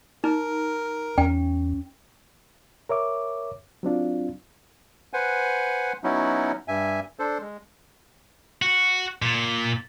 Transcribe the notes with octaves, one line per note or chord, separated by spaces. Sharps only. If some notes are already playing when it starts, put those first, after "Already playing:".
D#4 A#4
E2 C#4 G5
A#4 C#5 E5 D6
F#3 C4 D4 F4
B4 C5 F#5 G#5
F#3 B3 C#4 D#4 E4 F#4
G2 E5 G#5
D4 A4 C5
G#3
F#4
A#2